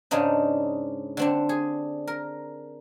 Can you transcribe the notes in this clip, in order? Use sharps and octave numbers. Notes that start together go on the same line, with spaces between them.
G#2 C#3 D4 D#4
D3 C4 D4
G#4
A#4